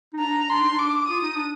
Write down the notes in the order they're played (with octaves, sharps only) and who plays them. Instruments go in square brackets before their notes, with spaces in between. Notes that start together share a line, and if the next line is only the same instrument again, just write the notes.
[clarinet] D#4
[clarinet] D4 [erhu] A#5
[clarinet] D4 [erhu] C6
[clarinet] D#4
D4
[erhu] D6
[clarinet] F4 [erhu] D#6
[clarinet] D#4
D4